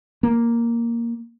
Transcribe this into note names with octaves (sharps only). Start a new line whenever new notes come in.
A#3